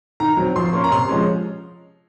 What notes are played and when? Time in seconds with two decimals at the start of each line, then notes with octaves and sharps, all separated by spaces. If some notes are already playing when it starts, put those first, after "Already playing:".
0.20 D#3 A#5
0.37 F#3 C4
0.56 F3 C6
0.66 C6
0.73 A#3 C#4 C#6
0.84 A#5
0.91 C3 C6
1.09 F3 G#3 C#4